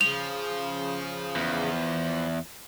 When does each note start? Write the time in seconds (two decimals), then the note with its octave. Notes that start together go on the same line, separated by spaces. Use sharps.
0.01 C#3 F3 F7
1.36 E2